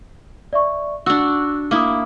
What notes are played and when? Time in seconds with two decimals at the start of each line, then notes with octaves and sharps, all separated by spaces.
0.53 D5 E5 C#6
1.06 D4 F#4 E6
1.71 A#3 E4 D6 D#6